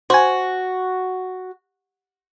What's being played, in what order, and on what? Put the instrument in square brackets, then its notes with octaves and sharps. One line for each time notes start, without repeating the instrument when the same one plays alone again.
[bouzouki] F#4 [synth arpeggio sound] C5 G#5